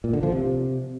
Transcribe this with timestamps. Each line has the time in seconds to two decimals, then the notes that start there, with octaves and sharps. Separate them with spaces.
0.04 A#2
0.13 D3
0.23 F3
0.32 C3